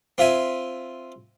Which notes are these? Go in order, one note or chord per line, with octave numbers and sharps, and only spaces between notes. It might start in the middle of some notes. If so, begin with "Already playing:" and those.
C4 F4 E5 G#5